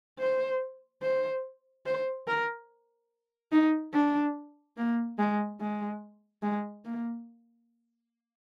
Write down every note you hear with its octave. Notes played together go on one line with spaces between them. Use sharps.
C5
C5
C5
A#4
D#4
D4
A#3
G#3
G#3
G#3
A#3